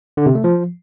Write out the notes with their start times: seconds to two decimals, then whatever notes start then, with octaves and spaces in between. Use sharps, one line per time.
0.17 D3
0.26 C3
0.35 A3
0.44 F3